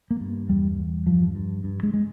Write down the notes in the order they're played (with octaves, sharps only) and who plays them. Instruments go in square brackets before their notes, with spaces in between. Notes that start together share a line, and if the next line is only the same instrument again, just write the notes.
[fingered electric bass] A#3
G2
E2 G3
E2
G2 F3
G2
G2
G#3
G#3